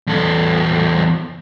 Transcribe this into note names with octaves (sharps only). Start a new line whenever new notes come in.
E2 A4